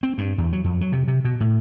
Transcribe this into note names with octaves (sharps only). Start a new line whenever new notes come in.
C4
G2
E2
F#3
F2
F#3
C3
C3
B2
A2